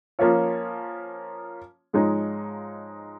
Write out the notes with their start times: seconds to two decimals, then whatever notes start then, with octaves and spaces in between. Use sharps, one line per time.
0.19 F3 A#3 C#4 F4 C#5
1.93 G#2 F3 G#3 D#4 C#5